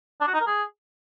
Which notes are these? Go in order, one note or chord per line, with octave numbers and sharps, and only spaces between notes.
D4
F#4
D#4
A#4
G#4